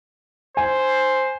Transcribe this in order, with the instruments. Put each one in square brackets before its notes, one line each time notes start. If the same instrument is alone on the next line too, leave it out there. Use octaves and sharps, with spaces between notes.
[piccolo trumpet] C5 [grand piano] G#5